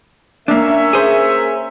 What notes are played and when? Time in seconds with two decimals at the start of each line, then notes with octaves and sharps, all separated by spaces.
0.48 A#3 C#4 D4 A#4 E5
0.93 G#4 C5